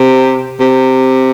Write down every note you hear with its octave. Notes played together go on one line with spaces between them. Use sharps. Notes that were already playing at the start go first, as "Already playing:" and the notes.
Already playing: C3
C3